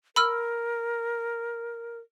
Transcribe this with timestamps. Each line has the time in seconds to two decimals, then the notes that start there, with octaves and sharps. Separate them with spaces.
0.16 A#4 B5 E6 F6